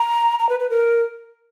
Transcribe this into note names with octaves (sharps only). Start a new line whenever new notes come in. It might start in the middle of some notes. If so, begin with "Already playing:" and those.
Already playing: A#5
A#5
B4
B4
A#4